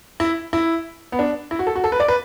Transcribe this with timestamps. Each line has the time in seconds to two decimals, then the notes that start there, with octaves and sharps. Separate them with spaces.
0.20 E4
0.53 E4
1.12 B3
1.19 D4
1.51 E4
1.59 F#4
1.67 A4
1.76 F#4
1.84 A4
1.92 B4
2.00 D5
2.08 B4